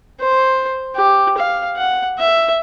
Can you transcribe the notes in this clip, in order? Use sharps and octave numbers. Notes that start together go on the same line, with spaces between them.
C5
G4
F5
F#5
E5